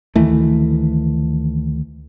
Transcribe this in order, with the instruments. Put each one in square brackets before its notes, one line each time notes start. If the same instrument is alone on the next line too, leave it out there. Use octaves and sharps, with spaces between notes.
[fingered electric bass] D2 D#3 E3 A3